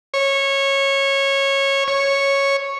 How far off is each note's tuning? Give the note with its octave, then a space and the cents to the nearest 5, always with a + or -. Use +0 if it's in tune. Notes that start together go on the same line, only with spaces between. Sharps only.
C#5 -15
C#5 -5